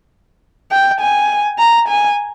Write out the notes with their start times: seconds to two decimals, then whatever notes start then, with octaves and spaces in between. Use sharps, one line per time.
0.71 G5
1.00 G#5
1.58 A#5
1.88 G#5